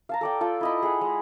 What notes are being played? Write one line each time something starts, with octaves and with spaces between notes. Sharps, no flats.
F5 A5 A#5
A4 D5 G5
F4 A4 G5
E4 D#5 B5
G#4 F#5
G#3